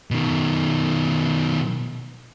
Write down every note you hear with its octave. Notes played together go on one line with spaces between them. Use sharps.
B2 D#3